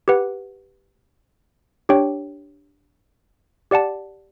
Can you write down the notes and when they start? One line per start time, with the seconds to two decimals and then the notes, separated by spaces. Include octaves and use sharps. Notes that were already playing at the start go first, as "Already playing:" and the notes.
0.08 G4 B4 F#5
1.89 D4 G4 C#5 G5
3.71 G4 D5 F#5 A5